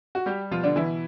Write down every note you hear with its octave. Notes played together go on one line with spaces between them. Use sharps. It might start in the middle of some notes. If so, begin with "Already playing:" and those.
F#4
G3 G4
B2 F3 F4
D3 D4
B2 E3 E4